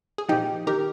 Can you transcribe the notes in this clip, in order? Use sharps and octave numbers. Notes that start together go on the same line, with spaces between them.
G#4
A#2 F3 D#4 G4
D#3 G4 A#4